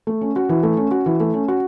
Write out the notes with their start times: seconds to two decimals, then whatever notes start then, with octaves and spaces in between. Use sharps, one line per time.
0.07 A3
0.21 C#4
0.36 F#4
0.49 E3
0.63 A3
0.77 C#4
0.91 F#4
1.06 E3
1.20 A3
1.34 C#4
1.48 F#4